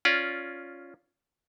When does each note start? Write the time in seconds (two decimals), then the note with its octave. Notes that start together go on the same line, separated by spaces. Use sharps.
0.05 C#4 F4 D5